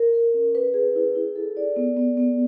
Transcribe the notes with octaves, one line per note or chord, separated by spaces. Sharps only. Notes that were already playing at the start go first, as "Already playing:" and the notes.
Already playing: A#4
A#4
C#4
B4
G#4
E4
E4
A4
D5
B3
B3
B3